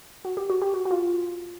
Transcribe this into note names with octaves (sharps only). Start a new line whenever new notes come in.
F#4
G4
F#4
G4
F#4
F#4
F4